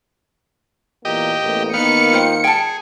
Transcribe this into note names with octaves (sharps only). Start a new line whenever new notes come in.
E2 A#2 A#3 G4 D#5
A1 E2 A#3
D#3 A#3 B3 F5 C#7
F4 C5 G5
G#4 G5 A5